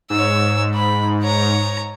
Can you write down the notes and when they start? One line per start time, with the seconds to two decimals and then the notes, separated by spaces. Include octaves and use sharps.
0.10 G#2 C#5 E6
0.75 B5
1.22 C#5 A#5